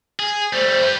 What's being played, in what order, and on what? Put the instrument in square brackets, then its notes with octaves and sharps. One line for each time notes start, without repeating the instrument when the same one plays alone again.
[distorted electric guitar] G#4
[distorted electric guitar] G3 A3 [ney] C5
[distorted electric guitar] G4 B4